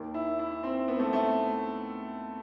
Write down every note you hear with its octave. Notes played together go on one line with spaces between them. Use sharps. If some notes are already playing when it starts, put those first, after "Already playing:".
Already playing: D#2 D#3
E4
E4
C4
B3
A3
A3